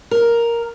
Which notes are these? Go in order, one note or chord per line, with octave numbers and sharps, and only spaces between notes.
A#4